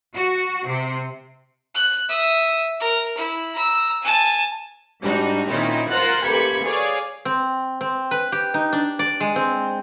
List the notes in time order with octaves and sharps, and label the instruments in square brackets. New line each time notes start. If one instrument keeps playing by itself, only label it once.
[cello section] F#4
C3
[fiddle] F#6
E5 D#6
A#4
E4
A#5 E6
G#5 A5
[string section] G#2 G3 D4 D#4 F#4
A#2 D#3 C4 C#4 D#4 E4
F4 A#4 C5 F#5 F#6 A6
A1 A#3 G4 B5 G#6 C#7
G#4 C#5 D5 F5
[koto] C4
C4
B4
G4
D#4
D4
D5
G#3
C4